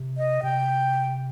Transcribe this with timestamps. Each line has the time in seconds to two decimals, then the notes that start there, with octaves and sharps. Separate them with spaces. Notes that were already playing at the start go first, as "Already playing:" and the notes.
Already playing: C3
0.17 D#5
0.43 C3 G5